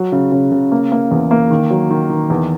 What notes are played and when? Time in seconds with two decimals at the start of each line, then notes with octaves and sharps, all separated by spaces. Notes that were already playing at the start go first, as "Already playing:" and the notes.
Already playing: F#3
0.12 C#3
0.32 C#3
0.52 C#3
0.72 A#3
0.92 A#3
1.11 E2
1.31 A#3
1.51 D#3
1.70 F#3
1.90 D#3
2.10 D#3
2.30 E2